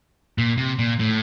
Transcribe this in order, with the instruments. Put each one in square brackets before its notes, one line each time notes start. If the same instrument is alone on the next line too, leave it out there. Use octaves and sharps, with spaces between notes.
[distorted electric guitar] A#2
C3
A#2
A2